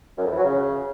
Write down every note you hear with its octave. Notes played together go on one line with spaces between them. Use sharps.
F#2
F2
E3
F#3
C#3